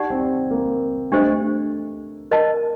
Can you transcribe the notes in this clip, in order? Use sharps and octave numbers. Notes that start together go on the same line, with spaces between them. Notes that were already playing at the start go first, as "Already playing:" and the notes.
Already playing: D#4 G4 D5 F#5
C4
A#3
A3 D4 G4 C5 D#5
A#4 D#5 A5